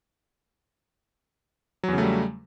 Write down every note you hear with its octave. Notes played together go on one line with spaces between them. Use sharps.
E2 C#3 F#3 G3 A3